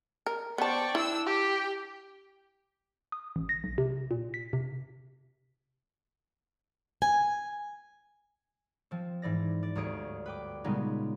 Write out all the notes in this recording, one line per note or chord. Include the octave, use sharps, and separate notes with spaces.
A#4
B3 C5 D5 G5 A5 C#6
D4 E4 E6
G4 G5
D#6
A1
A#6
B1
C3
A#2
B6
C3
G#5
F3 C4
G#2 E3 D5 A#6
D5
G1 D2 C#5 D#6 D7
B4 G5 D6
A#2 C#3 G3 G#3 B3 D#4